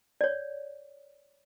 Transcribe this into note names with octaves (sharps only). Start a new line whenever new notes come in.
C#5 D5